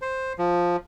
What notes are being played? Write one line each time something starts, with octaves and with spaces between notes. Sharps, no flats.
C5
F3